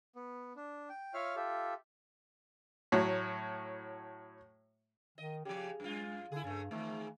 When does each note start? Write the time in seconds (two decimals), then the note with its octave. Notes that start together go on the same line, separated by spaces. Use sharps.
0.16 B3
0.56 D4
0.90 G5
1.14 F4 C#5 E5 F5 F6
1.36 F4 G4 A4 E5
2.92 A2 F#3
5.18 D#3 D#5
5.45 C#3 F3 G4
5.80 F#2 G#3 F4
6.32 D3 E4 G#4
6.44 G2 C#3 A3
6.71 E2 G#2 D#3 A3